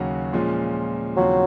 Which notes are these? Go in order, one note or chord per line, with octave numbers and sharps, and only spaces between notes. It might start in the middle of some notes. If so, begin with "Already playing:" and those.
Already playing: D#2 C#3 F#3 C#4 F#4
A#2 F3 G#3 C#4
D#2 C#3 F3 F#3 C4 F#4